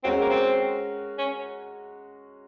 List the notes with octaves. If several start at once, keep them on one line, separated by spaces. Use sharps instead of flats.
G#3 C4 C#4 F#4 A#4
A#3
C4
C#4